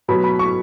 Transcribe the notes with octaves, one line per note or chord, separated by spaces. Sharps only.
B2 F#3 B3 B5
B5
C#6